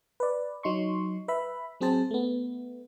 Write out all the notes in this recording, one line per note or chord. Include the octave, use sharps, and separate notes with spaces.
B4 D5
F#3 D#4 C6 C#6
B4 E5 B5
F#3 C4 G#4 C5 A5
A3 B3